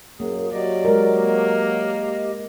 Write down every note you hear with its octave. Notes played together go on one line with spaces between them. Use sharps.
F#2 F#3 A#3 G#4
F#3 G4 D5 D#5
G#3 A#4
A#3